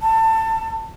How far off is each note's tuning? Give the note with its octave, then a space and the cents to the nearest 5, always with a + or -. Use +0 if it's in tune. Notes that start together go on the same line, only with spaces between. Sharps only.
A5 +25